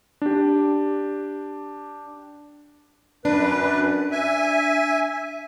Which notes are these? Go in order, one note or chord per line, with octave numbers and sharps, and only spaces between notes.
D4 G4
F#2 D4 B4
E5 G#5